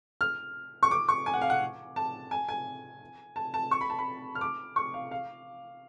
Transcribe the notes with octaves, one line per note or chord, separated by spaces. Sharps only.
F6
C#6
D6
C#6
G#5
F#5
F5
F#5
A5
G#5
G#5
A5
A5
C#6
B5
A5
B5
F6
D6
C#6
F5
F5